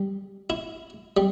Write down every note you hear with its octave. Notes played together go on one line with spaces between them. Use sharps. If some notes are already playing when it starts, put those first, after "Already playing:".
Already playing: G3
E4
G3